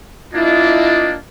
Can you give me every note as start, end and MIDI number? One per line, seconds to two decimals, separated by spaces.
0.34 1.17 58
0.34 1.17 62
0.34 1.12 64
0.34 1.15 65
0.34 1.15 75